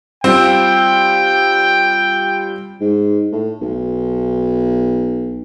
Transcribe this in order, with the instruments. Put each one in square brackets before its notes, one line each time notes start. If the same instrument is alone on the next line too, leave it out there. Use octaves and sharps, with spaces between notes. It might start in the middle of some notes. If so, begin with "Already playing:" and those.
[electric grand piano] G3 F4 [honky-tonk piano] C4 [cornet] G5
[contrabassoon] G#2
A2
B1